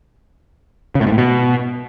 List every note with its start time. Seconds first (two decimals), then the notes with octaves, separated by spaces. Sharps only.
0.95 C#3
1.01 A2
1.07 G#2
1.12 A2
1.18 B2